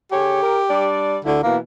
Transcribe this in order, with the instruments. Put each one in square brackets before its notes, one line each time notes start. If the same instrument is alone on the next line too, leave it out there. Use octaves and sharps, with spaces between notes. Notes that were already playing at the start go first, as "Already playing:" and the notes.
[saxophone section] D3 G#4 C#5 [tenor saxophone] G4
[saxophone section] A#4
G3 D4 D5
[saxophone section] D2 E4 [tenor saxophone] D3
[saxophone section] B2 E3 [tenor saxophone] A#3